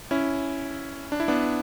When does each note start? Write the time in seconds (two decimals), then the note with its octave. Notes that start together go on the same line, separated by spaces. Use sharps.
0.11 C#4 E4
1.12 D4
1.20 E4
1.28 B3 D4